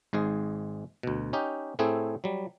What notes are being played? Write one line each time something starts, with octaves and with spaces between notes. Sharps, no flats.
G#1 G#2 G#3 G#4
D2 B2
C#4 D#4 G4
A2 A3 C4 E4 G#4
F#3 G3